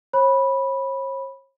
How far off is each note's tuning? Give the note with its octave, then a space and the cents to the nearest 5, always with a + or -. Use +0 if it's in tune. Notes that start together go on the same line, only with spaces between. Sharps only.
C#5 -45 B5 -10